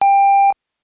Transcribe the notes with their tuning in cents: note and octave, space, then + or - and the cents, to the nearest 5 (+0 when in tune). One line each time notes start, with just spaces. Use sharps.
G5 +20